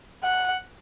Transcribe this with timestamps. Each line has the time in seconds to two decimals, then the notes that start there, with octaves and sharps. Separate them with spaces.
0.24 F#5